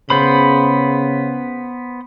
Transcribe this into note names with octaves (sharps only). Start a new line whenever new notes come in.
C#3 B3 C5 B5